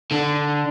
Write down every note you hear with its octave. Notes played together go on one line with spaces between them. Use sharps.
D3